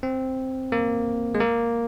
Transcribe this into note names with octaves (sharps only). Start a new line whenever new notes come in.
C4
A#3
G#3
A#3